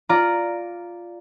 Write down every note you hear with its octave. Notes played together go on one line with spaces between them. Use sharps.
F4 D5 A#5